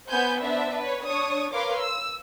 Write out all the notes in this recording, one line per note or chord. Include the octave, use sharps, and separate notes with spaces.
B3 C5 G#5 G6
B3 D4 C5 E5
B4 C#5
D4 C#5 C#6 D#6
A#4 B4 C#5 F5 C6 D6
E6